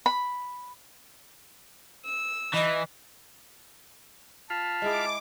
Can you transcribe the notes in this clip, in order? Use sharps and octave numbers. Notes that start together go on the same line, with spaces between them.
B5
E6
E3 D#5
F4 F5 A5 B5
G#3 E4 G#4 D6